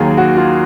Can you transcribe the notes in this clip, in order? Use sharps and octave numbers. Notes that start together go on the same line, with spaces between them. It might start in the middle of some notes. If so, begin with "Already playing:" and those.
Already playing: D#2 D#3 F#3 G#4
F#4
F4